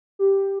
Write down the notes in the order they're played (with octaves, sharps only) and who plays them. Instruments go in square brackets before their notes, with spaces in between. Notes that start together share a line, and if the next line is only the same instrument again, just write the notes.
[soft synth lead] G4